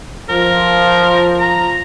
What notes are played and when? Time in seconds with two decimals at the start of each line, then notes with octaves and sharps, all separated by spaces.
0.29 F3 A#4
1.40 A#5